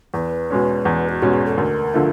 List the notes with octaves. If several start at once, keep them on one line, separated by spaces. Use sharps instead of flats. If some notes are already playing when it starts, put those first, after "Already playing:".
E2 B4
B2 G#3 C#4
E2
F#4
B2 G#3 C#4 G4
G#4
A4
D2 A#4
D3 F3 A3